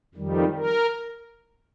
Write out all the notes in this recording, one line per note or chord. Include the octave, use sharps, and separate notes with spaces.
F2 D#3 G3
A#4